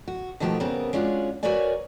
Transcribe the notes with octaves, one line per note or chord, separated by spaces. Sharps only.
F#4
B2 D#3 F3 A3 F#4 G4
C#3 G3 B3 C4 A#4
G#3 C#4 D4 F4 F#4
F#4 A#4 B4 C#5 D5 G#5